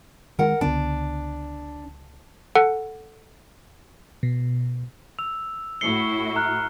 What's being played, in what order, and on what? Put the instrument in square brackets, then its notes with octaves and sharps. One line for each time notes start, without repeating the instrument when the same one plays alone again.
[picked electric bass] D#3 G#3 [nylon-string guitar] A#4 F#5
[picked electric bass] C#2 D3 B3 [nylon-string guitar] D4
[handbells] A4 F#5
[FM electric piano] B2
[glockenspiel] E6 F7
[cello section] A2 E4 F#4 [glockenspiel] C7 C#7 G7
[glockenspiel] A#5 F6 F#6